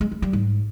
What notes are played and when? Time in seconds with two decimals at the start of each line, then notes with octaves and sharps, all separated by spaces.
0.01 G#3
0.12 G#3
0.22 G3
0.33 G#2